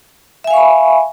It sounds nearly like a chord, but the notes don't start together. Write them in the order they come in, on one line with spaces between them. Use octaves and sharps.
E5 G#5 F5 C#6 B5